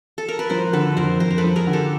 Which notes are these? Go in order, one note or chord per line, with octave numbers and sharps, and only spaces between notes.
A4
A#4
B4
F3 A#4 C5
D3 A4 B4
F2 A#4 C5
F2 A#4 C5
A#4
A4 B4
F3
G#4 A#4
D3
G4 A4